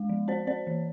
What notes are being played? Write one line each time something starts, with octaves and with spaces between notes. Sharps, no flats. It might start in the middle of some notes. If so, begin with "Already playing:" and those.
Already playing: G#3
F3
C4 C5 D5
C4 C5 D5
E3